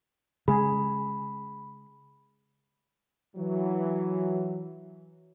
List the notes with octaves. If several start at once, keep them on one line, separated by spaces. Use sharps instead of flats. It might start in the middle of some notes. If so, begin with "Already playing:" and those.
C#3 G#3 G#4 B5
E3 F#3